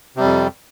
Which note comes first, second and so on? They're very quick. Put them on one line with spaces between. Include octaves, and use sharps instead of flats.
C3 G3 F2